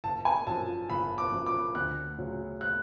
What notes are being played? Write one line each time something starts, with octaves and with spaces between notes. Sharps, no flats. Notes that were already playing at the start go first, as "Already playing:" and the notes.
F#1 A5
G#5
F#2 F3 A5
F#1 B5
D6
F#2 F3
D6
D2 F#6
C#3 F#3
F#6